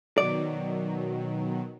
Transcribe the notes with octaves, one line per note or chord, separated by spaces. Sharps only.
B2 D#3 F#3 D5